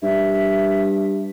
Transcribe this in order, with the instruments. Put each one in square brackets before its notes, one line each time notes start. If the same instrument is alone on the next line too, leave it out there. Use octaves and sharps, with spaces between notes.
[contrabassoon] G2 [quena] E5